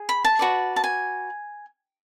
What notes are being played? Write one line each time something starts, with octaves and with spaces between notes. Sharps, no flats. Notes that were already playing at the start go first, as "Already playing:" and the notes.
Already playing: G#4
B5
A5
F#4 B4 D5
A5
G#5